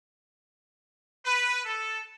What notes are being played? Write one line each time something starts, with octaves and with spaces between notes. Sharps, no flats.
B4
A4